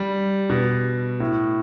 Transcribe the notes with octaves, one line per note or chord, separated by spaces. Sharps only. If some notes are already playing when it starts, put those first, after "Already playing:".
Already playing: G3
B2
A2